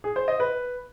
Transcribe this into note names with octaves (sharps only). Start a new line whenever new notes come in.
G#4
C5
D#5
B4